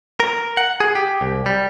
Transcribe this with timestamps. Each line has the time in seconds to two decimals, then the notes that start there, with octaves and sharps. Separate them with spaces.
0.20 A#4
0.57 F#5
0.80 G#4
0.95 G4
1.21 C2
1.46 G3